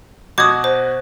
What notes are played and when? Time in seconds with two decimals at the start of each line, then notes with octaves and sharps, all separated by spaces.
0.38 B2 F#4 D6 D#6 G#6
0.64 C5